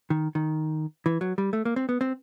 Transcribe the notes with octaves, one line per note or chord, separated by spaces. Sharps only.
D#3
D#3
E3
F#3
G3
A3
A#3
C4
B3
C4